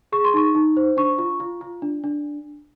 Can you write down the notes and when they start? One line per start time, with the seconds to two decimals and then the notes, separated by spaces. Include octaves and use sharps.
0.12 G#4 C#6
0.24 C6
0.34 D#4 C#6
0.55 D#4
0.77 C5
0.97 D4 C#6
1.18 F4
1.40 F4
1.61 F4
1.82 D4
2.04 D4